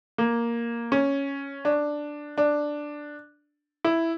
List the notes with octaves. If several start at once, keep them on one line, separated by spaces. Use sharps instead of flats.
A#3
C#4
D4
D4
E4